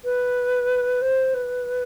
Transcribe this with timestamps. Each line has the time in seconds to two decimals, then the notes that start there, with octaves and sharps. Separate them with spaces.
0.05 B4
1.02 C5
1.34 B4